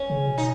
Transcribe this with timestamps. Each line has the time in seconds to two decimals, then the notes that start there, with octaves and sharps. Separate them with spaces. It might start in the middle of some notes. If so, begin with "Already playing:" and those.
Already playing: C#4
0.10 C#3
0.28 B2
0.38 D#4